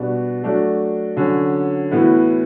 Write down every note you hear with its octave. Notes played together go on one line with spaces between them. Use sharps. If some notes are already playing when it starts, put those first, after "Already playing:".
Already playing: B2 G3 B3 D4 F#4
F#3 A3 D4 F#4
D3 F#3 C#4
A2 E3 B3 F#4